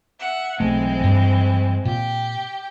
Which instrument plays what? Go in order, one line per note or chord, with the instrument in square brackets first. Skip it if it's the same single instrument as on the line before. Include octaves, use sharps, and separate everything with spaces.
[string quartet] E5 F#5
[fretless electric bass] B1 A3 [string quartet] E3 G#3 C4
[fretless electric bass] G2 G3
[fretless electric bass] A#2 [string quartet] G4 G5